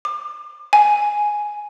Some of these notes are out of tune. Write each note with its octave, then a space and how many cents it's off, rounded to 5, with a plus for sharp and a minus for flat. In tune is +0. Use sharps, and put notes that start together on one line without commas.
D6 +30
G#5 +5